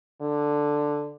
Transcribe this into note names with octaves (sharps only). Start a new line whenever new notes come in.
D3